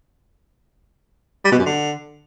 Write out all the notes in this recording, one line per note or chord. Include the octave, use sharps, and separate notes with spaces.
G3
B2
F#2
D3